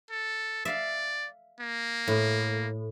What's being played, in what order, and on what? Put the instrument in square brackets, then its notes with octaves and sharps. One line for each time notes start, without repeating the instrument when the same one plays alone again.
[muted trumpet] A4
[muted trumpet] D5 [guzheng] E5 F5
[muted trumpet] A#3
[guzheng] A2